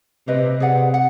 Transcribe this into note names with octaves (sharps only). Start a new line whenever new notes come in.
C3 G4 B4 D#5
C3 G#4 B4 D5 F#5
F#5